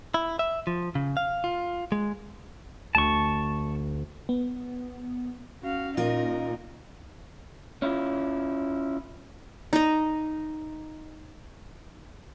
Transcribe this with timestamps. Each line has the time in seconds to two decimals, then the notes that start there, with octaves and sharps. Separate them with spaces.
0.14 E4
0.39 E5
0.67 F3
0.95 C#3
1.17 F5
1.44 F4
1.92 G#3
2.95 D2 A5 C#6
4.29 B3
5.63 C#4 F#4 F5
5.97 A#2 D#4 F4 A#4 D#5
7.82 C#4 E4 F4
9.73 D#4 D#5